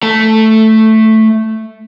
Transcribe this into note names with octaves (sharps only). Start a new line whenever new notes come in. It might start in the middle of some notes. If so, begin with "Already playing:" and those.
A3 A5